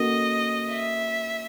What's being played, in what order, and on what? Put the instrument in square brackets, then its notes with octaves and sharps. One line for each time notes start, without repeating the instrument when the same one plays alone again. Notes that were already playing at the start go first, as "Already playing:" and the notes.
Already playing: [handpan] A#3 C#4 F#4 A4 [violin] D#5
[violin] E5